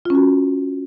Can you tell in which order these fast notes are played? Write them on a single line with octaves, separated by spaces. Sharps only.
F4 C#4 F#4